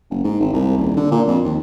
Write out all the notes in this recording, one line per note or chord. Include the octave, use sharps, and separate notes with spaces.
F#1
G#2
G#1
C2
D#1
D3
A#2
F2
D#2